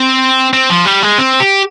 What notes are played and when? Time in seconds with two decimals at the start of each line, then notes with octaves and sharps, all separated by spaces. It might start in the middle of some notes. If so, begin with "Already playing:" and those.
Already playing: C4
0.53 C4
0.70 F3
0.85 G3
1.03 G#3
1.18 C4
1.40 G4